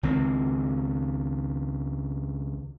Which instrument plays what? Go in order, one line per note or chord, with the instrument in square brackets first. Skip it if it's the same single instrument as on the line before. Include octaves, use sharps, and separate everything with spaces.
[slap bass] C#2 D#3 C4